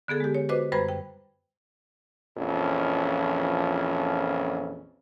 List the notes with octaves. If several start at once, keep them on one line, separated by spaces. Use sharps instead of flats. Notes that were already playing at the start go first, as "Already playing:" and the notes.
D3 B3 G#4 A4
G#3 G4
C#5
F#4 B4 C5 D#5 D6
F#2 G3 B4 C5 B5 G#6
G5
A#1 F2 E3 C#4